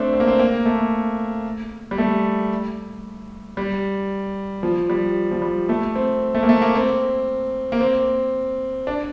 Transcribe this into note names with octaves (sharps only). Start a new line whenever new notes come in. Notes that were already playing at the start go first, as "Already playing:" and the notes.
Already playing: A3 C4 D4
C4
A#3
C4
A#3
A3
G3
A3
G3
F3
G3
F3
G3
A3
C4
A3
A#3
A3
A#3
C4
A#3
C4
D4